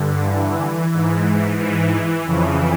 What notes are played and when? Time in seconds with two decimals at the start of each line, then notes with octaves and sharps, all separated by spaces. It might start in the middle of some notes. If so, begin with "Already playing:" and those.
Already playing: G2 D3
0.24 E3
0.91 G#2 E3
1.58 E3
2.25 F2 C#3 E3